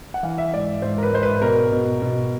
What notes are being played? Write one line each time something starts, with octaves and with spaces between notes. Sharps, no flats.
F#5
E3 F5
E5
G#2 D5
G#2 C5
A#4
B4
G#2 C5
B4
B2 A#4
B2
B2